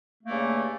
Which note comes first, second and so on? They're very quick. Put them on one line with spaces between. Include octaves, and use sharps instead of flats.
A3 A#3 G2 C#3